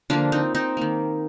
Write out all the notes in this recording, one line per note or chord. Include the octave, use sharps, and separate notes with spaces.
D3 F3 A#3 D4 F4
C4 D#4
C4 D#4
D#3 A#3